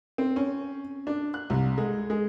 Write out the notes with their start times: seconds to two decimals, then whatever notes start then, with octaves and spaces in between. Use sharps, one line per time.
0.18 C4
0.36 C#4
1.07 D4
1.34 F#6
1.50 C2
1.78 G#3
2.10 G#3